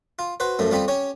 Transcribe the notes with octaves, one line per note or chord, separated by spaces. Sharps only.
F4
F#4 B4 C5
F#2 F3 A3
F2 G3 F4 G4 B5
C#4 G4 C#5